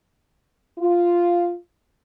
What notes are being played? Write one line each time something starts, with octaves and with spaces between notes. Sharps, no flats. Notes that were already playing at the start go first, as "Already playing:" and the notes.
F4